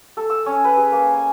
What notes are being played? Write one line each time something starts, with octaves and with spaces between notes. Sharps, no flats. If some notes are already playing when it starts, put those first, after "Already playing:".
A4
E6
C#4
B4
G#4
A#3
G#5